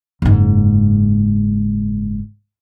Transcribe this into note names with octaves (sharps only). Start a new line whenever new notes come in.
F#1 G#2